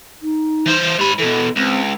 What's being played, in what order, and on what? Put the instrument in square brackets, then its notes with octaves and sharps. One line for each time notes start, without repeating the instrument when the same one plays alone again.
[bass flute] D#4
[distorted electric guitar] E3 C5
[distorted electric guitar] G#2 B5 [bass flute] G4
[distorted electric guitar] B2 E3 [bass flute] A4
[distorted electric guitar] C#2 [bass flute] C4